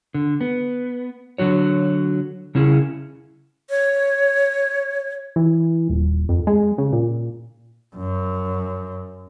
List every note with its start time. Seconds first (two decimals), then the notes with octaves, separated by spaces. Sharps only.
0.14 D3
0.41 B3
1.38 D3 F#3 F#4 C#5
2.55 C#3 C#4 E4 G#4
3.70 C#5
5.36 E3
5.89 D#1
6.29 F2
6.47 G#3
6.78 C#3
6.93 A#2
7.96 F#2